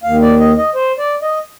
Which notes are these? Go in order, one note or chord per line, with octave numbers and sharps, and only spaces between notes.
D#2 D#3 F5
D5
D#5
D#5
C5
D5
D#5